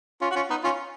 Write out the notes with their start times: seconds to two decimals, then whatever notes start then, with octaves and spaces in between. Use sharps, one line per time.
0.22 C#4 F4
0.31 F#4
0.35 C#4 F4
0.50 B3 D#4
0.64 C#4 F4